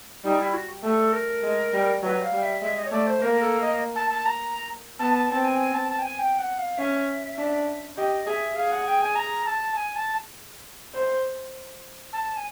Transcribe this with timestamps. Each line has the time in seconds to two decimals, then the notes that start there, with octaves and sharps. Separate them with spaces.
0.24 G3 D#4
0.39 E4
0.54 F#4
0.83 A3 A4
1.13 A#4
1.43 G#3
1.73 G3
2.03 F#3 B4
2.22 F5
2.33 G3
2.42 E5
2.62 G#3 E5
2.77 D#5
2.85 C#5
2.92 A3 D5
3.07 C5
3.21 A#3 A#4
3.41 A4
3.61 D#5
3.96 A5
4.11 A5
4.26 A#5
4.99 B3 A5
5.14 A5
5.30 C4 A5
5.44 G#5
5.59 G#5
5.74 A5
5.89 A5
5.99 G5
6.03 G#5
6.19 G5
6.39 F#5
6.59 F5
6.78 C#4 E5
7.38 D4
7.97 G4 D#5
8.27 G#4 E5
8.56 G#4 F5
8.72 F#5
8.86 G5
9.02 G#5
9.16 A#5
9.46 A5
9.76 G#5
9.96 A5
10.94 C5
12.13 A5
12.37 G#5